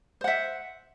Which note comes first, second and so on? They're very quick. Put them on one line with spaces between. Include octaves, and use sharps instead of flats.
C5 F#5 E5